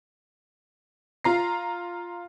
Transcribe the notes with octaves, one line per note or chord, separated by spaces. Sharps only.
F4 A#5 C7